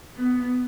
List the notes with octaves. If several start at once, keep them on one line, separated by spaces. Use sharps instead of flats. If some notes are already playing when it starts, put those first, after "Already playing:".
B3